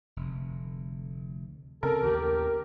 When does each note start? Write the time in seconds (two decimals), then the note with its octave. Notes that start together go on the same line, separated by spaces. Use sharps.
0.16 F1 D2
1.83 C#3 C4 A4 A#4
2.03 A1 D#2 D#3 G4